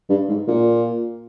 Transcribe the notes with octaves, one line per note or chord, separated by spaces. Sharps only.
G2
G#2
A#2